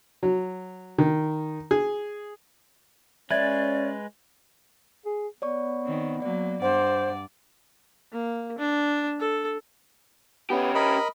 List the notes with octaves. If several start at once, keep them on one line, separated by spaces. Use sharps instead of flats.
F#3
D#3
G#4
G#3 C#4 B4 D5 E5 G#6 A6
G#4
B3 C#5 D5 C#6
D#3 C4
F#3 A#3 D5
G2 C5 D5 F#5
A#3
D4
A4
B3 C#4 G4
A#4 D#5 B5